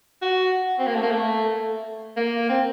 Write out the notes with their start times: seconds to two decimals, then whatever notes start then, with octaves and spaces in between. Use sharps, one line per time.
0.22 F#4
0.79 C4
0.87 A#3
0.95 A3
1.02 A#3
1.11 A3
2.17 A#3
2.49 C4